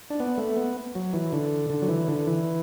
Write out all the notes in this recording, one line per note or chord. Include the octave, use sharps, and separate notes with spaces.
D4
B3
A3
B3
F#3
E3
D3
D3
F#3
E3
D3
E3